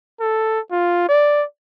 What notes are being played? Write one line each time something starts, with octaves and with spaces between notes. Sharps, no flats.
A4
F4
D5